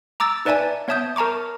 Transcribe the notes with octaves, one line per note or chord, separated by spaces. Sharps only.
A#5 D6 E6 A6
D#4 B4 D5 E5 G#5 A5
B3 C#5 E5 A5 D#6 G6
A#4 A5 A#5 C#6 D6